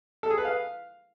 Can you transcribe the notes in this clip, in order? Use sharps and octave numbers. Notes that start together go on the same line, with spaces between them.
A4
G#4
B4
F5